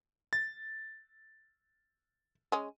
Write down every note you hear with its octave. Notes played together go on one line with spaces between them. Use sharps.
A6
G#3 C#4